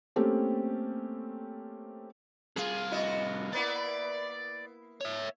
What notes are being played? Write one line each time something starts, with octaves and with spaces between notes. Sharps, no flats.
A3 A#3 C4 C#4 G4 A4
C2 F4 G#4
E4 F#4 D#5
A#3 B3 E4 D5
C#5 E5